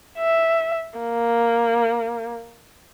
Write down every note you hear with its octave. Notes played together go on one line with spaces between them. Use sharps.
E5
A#3